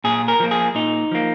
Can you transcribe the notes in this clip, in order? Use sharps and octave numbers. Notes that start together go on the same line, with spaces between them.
A#2 G#4
A#4
F3 A#3
G#4
A#2 D#4
F3 A#3